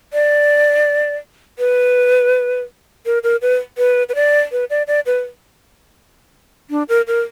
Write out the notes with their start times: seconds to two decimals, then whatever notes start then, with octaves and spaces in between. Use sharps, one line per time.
0.13 D5
1.59 B4
3.06 A#4
3.24 A#4
3.42 B4
3.78 B4
4.09 B4
4.15 D5
4.52 B4
4.70 D5
4.87 D5
5.06 B4
6.70 D4
6.89 A#4
7.07 A#4